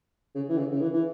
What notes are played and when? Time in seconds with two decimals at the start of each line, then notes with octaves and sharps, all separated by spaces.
0.35 C#3
0.49 E3
0.57 C#3
0.71 C#3
0.81 E3
0.93 E3